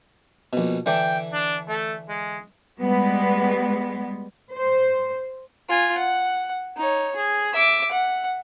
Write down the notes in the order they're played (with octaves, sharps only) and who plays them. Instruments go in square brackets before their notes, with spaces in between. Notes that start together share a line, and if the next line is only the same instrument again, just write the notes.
[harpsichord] A#1 B2
[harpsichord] D3 E3 D5 [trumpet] G5
[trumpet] D4
A3
G#3
[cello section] G3 G#3 B3
C5
[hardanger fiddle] F4 G#5
F#5
D#4 C#5
G#4
E5 D6
F#5